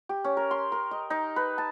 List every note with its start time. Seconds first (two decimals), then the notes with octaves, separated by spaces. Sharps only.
0.09 G4
0.24 C#4
0.37 A#4
0.51 C6
0.72 A#4
0.91 D#5
1.10 D#4
1.36 B4
1.58 A5